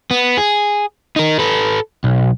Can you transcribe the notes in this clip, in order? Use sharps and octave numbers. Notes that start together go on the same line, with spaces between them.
B3
G#4
D#4 A#4
A4 B4
B1